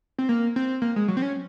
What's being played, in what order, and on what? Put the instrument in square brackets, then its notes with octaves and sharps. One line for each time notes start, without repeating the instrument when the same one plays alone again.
[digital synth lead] C4
A#3
C4
A#3
G#3
F#3
C4
C#4